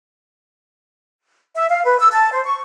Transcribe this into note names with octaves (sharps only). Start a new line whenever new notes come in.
E5
F5
B4
E6
A5
C5
C#6